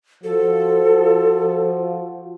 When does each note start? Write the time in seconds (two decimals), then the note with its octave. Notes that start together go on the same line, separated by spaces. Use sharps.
0.24 F3 F#4 A4